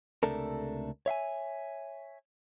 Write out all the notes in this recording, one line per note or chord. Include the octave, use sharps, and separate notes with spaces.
C#2 C3 A3 D4 A4 A#4
C#5 E5 F5 G#5